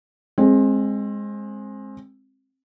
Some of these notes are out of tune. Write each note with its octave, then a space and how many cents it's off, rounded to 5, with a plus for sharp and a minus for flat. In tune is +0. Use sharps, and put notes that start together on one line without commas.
G#3 +0 C4 +25